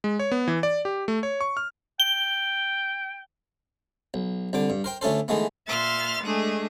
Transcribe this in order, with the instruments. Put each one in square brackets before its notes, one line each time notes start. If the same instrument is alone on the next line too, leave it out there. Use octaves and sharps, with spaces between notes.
[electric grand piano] G#3
C#5
B3
E3
D5
G4
A3
C#5
C#6
F6
[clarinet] G5 [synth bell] G7
[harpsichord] B1
C2 D3 D6
G2
A#4 C5 G5
D2 A3 C#4 A4 C5
D#3 E3 G#3 A3 B3
[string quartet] A#2 E5 C6 F6 A6
G#3 A3 D4 G#4